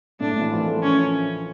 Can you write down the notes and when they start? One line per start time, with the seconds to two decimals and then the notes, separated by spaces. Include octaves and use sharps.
0.20 A2 A3 D4
0.31 A2 A3
0.41 E3 E4
0.52 F3 F4
0.61 A#4
0.67 A3 A4
0.83 C#4